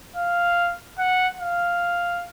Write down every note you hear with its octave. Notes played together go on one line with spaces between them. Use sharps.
F5
F#5
F5